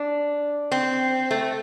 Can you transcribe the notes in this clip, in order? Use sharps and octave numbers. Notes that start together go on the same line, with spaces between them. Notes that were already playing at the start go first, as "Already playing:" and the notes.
Already playing: D4
C4
A3